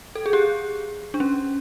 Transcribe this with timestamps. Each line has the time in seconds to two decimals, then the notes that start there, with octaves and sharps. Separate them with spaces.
0.15 A4
0.26 G#4
0.33 G4
1.14 D4
1.20 C#4